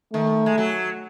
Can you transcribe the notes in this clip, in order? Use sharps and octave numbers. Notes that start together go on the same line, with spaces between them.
D#3 A3
G#3
F#3